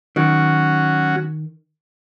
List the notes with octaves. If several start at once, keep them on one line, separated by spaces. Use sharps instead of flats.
D#3 F#3 C#4 F#4